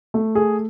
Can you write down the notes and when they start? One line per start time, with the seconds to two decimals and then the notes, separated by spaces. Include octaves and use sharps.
0.14 A3
0.35 G#4